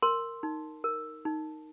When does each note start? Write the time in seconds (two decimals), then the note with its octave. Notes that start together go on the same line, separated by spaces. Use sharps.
0.02 A#4 C6
0.43 D#4
0.84 A#4
1.25 D#4